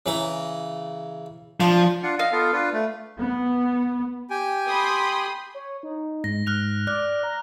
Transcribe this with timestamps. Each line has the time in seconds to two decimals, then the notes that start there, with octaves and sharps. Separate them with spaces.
0.06 C#3 E3 A#5
1.60 F3 D4
2.03 D4 F4 F#5
2.19 D#5 F5
2.32 B3 F4 A4
2.53 D4 F4 B4
2.73 A3
3.19 B3
4.30 G4 G5 G#5
4.67 B5 C6 D#6
5.54 C#5
5.83 D#4
6.24 G#2 A#6
6.47 G#2 F6 F#6 F7
6.87 D5 F6 F#6
7.23 A#5